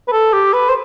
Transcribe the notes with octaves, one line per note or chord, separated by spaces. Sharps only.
B4
A4
G4
B4
C5